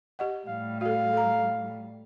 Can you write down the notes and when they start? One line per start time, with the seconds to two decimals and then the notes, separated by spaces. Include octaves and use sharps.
0.19 G4 D#5 F#5
0.48 A2 G3 F5
0.81 F#4 A4 F5
1.13 A4 A#5